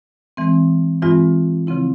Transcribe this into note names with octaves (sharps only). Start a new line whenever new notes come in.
E3 G#3 C4
G2 E3 G#3 C4 F4
C#3 F3 C4 E4